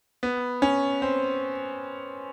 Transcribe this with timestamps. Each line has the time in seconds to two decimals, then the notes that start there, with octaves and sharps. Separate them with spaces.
0.23 B3
0.62 C#4
1.02 C4